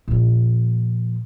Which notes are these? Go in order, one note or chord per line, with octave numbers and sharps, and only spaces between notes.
A#2 F3